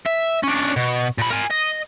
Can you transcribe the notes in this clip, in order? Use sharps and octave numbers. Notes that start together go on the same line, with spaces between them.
E5
C#4 D4
B2
A#2 B5
A#4 G#5
D#5